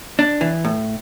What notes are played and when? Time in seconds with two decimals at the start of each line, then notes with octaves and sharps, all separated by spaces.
0.19 D4
0.41 E3
0.65 A2